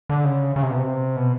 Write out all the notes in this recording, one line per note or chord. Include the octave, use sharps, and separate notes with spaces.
D3
C#3
C#3
C3
B2
C3
B2